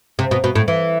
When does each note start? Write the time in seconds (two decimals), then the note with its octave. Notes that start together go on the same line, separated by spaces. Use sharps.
0.19 C3
0.31 B2
0.44 B2
0.55 A2
0.68 E3